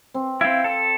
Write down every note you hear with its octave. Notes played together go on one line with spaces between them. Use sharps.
C4
C4 E4 F5
A4